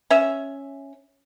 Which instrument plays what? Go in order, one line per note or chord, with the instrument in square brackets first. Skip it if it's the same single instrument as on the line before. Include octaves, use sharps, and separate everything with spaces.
[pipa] C#4 E5